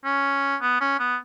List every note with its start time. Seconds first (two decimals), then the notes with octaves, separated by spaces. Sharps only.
0.05 C#4
0.61 B3
0.81 C#4
0.99 B3